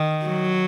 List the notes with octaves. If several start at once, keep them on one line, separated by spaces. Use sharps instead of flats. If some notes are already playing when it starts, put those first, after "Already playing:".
Already playing: D#3
F#3